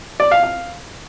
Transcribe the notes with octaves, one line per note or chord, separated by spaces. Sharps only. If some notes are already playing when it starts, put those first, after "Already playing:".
D5
F5
F5